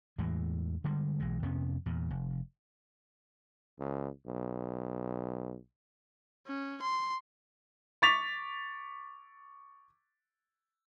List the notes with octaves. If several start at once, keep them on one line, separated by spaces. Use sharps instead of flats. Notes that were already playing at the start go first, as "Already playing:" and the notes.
E2 A2 E3 G#3
D3 G3 G#3
B1 E3 G#3
F2 C3 B3 C#4
E2 A#2
F1
C#2
B1
C#4
C6
C#6 D6 A6 B6 F7